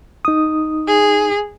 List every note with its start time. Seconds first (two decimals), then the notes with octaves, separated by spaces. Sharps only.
0.25 D#4 D#6
0.88 G#4